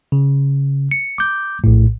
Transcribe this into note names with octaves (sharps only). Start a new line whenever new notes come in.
C#3
C#7
D6 G6
A#1 A2